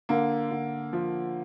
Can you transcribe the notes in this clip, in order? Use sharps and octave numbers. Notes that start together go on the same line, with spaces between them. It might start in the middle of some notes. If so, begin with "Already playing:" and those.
D3 A#3
D3
F3